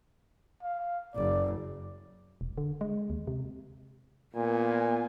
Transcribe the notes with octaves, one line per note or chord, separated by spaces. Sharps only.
F5
F#1 D5
E1
D3
G#3
D#2
C3
A#2 B3 G#5